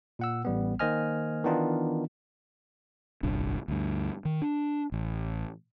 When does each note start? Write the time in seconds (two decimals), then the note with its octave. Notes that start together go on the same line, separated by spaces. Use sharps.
0.19 A#2 F#5 E6
0.45 A1 G3 B3
0.79 D#3 A#3 C5 D#5 G#5 F6
1.44 D#3 E3 B3 D4 D#4 F4
3.23 D1 G1 C2 D4
3.68 D2 G2
4.25 D#3
4.42 D4
4.92 A1